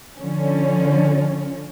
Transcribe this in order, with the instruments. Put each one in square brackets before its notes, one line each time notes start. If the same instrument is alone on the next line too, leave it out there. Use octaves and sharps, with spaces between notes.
[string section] D3 F3 C#4